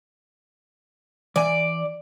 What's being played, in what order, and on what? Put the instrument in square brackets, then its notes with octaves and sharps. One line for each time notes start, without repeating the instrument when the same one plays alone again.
[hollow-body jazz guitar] E3 G#5 [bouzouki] D5